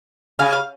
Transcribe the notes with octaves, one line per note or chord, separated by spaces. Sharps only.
C#3 F5 G#5
F5